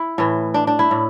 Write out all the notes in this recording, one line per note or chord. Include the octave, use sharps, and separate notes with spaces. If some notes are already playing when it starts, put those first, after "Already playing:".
Already playing: E4
A2 E3
D4
D4
E4
A2